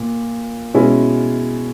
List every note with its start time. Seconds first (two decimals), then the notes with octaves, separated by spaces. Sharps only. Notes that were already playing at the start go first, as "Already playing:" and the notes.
Already playing: A#2
0.74 B2 G#3 C#4 E4